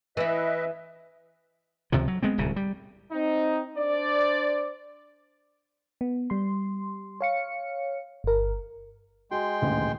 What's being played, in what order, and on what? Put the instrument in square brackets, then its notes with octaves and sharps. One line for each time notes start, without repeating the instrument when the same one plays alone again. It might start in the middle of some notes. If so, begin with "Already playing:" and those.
[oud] E3 E4 [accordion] B4 D#5 E5
[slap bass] C#2 C3 D#3 F3
F#3
G#3 B3 C4
D1 C2 C#3
G3
[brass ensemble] C4 D#4
D4 C5 D5
[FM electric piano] B3
G3 C6
C#5 F5 C#7
G1 A#4
[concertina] G#3 G5 C6 [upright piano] F#4
[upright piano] D#1 A1 D2